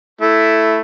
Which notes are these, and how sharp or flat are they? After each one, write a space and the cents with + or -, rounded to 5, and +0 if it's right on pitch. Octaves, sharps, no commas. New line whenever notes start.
A3 +0 E4 +0